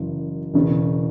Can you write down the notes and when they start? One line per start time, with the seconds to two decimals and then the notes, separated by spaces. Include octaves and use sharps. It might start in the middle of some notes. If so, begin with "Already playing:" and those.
Already playing: F#1 F#2 E3
0.54 E1 E2 C#3